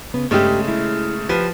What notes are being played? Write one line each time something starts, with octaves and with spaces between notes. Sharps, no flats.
C#3 B3
G2 C#3 G#3 A3 G4
E4
F3 G4 B4